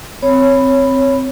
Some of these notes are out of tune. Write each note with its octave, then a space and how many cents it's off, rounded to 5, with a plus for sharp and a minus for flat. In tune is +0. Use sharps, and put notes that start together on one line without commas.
C4 -5 C#5 +0 B5 +0